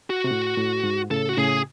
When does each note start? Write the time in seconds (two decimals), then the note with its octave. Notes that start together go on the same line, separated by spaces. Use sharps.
0.10 F#4
0.24 C3
0.31 A2
0.58 A2
0.84 G#2
1.11 A2 C#3 A4
1.29 F#4
1.38 A2 C#3 G#4